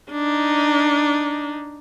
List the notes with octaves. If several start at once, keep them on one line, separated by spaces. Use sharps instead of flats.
D4 D#4